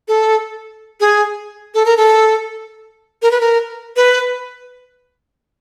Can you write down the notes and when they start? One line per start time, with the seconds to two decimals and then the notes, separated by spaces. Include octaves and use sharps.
0.08 A4
1.00 G#4
1.75 A4
1.86 A#4
1.97 A4
3.22 A#4
3.31 B4
3.41 A#4
3.96 B4